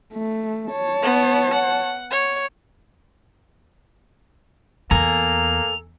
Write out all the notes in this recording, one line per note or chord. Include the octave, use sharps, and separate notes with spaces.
A3
C#5 A5
B3
F#5
C#5
E2 A#3 A4 G#5 A#5 F7